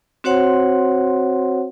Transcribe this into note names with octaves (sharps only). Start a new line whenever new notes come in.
C4 F#4 C5 C#5 F#5 C6